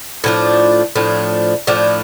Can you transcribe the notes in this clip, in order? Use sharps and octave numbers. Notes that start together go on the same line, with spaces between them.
A2 F3 D4
A2 F3 D4
A2 F3 D4